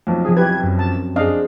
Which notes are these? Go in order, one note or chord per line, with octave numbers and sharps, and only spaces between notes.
B1 F2
F3 C4 G#4
E4 G4 B4 G#6
F#2
A5
D4 G#4 C5 D#5 F5